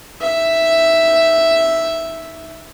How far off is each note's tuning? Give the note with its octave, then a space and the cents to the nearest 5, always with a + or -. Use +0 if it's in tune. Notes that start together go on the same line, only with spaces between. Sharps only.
D#4 +5 E5 +0